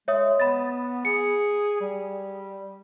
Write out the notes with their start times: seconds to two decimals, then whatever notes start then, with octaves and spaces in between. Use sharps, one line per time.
0.08 G#3 C#5 E5 D#6
0.40 B3 B5 A6
1.05 G#4 C#7
1.81 G3